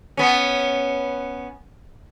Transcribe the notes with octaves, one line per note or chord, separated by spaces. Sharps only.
B3 C#4